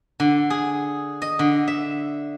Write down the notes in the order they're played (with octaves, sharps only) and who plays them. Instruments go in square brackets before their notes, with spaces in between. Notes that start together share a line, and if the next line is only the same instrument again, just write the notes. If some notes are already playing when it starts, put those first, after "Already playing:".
[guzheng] D3
G#4
D#5
D3
E5